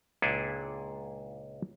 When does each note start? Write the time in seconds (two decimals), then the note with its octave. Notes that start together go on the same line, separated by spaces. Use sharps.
0.22 C#2 A#2 D4 E4 G#4 A4